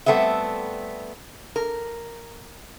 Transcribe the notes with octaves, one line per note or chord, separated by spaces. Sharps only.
G3 A3 B3 C4 E5
A#4